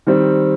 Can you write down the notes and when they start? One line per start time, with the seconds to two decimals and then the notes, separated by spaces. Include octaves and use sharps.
0.07 D#3 G3 C4